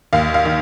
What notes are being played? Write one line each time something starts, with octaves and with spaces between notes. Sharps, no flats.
D#2 F5
F5
D#3